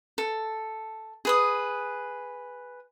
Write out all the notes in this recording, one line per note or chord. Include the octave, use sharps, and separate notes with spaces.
A4
G#4 B4 D#6